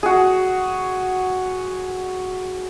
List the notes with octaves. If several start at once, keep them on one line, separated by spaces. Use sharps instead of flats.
F#4 G#4